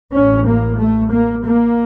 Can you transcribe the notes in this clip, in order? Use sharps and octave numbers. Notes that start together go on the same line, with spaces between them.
A1 A2 C#4
A#3
A3
A#3
A#3